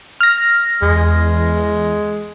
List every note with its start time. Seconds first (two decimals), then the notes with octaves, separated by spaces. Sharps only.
0.21 F6 A#6
0.82 E2 G#3